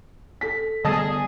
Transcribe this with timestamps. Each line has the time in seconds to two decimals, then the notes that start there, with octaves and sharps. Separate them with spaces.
0.41 A4 B6
0.85 D3 G3 B3 G#4 D#5 A5 D#6